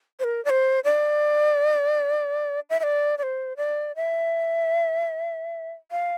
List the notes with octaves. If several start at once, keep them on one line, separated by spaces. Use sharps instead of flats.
C5
A#4
D5
C5
D5
E5
E5
D5
D5
C5
D5
E5
F5